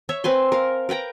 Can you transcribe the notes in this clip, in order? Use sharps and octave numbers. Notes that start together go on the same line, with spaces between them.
C#5 E5
C4 B4 G#5 C6
A#4 F5
A#4 B4 G5 A#5